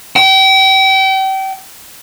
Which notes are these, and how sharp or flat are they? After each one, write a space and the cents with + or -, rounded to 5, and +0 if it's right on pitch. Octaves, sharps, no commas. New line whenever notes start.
G5 -35